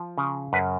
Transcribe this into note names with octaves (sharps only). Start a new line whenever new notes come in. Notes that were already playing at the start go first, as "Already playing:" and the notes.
Already playing: F3
C#3
F#2 B4